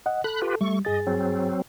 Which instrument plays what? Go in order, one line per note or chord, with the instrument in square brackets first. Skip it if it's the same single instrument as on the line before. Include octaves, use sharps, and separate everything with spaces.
[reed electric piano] D#5 F#5
[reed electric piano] A4 [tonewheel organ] B5 F#6
[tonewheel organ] F4 G4 B4
[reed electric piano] G3 [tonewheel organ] A3 C#6
[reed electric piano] G2 G#4 A6 [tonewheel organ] D#5
[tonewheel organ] F#3 C4